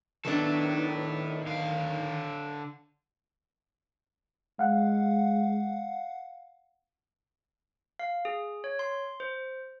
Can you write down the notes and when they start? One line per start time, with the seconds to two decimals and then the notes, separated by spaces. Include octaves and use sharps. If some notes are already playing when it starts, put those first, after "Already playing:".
0.25 D#3 F#3 B3 D4 E4 A4
1.47 D3 F5
4.59 G#3 F5 F#5
7.99 F5
8.25 G#4
8.64 C#5
8.79 C6
9.20 C5